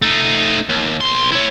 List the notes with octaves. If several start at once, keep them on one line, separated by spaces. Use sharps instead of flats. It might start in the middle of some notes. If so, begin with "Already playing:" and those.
A3 D#4
D#2
B1 C6
E4 C#5